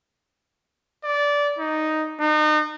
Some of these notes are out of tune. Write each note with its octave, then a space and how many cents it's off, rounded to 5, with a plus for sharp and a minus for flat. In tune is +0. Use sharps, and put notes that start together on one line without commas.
D5 -15
D#4 +0
D#4 -35